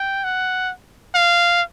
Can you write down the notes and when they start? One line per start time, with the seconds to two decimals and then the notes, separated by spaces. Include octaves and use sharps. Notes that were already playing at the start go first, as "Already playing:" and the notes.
Already playing: G5
0.24 F#5
1.14 F5